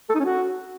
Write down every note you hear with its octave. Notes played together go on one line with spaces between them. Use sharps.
A4
D#4
C#4
F#4